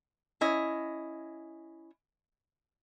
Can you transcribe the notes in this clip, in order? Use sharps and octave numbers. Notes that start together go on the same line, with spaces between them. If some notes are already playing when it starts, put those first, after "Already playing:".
C#4 E4 D#5